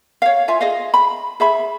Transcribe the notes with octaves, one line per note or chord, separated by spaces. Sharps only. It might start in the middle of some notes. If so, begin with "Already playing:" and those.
C#5 F5
F4 E5 G#5
G#4 D#5 F5
B5
G#4 E5 B5